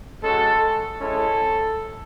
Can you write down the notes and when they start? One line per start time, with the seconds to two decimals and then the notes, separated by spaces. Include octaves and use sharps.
0.23 G#3 C#4 F#4 A4
1.01 G#3 C#4 E4 A4